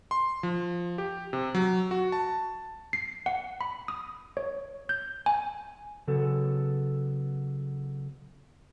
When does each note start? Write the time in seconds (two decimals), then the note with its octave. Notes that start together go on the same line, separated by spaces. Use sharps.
0.11 C6
0.43 F3
0.98 G4
1.33 C3
1.55 F#3
1.91 F#4
2.12 A5
2.93 C7
3.26 F#5
3.61 B5
3.88 D#6
4.37 C#5
4.89 G6
5.26 G#5
6.08 C#3 F#3 B3 A4